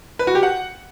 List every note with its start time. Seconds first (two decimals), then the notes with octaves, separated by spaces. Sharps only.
0.19 B4
0.27 F#4
0.35 G4
0.43 F#5